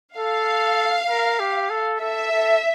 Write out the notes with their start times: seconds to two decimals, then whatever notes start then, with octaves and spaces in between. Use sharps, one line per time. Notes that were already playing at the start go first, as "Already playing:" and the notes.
0.17 A4 F5
1.10 A#4
1.40 G4
1.70 A4
2.00 A4 E5
2.31 A4